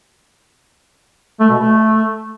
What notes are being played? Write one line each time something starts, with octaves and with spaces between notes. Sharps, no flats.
A3
B2
A3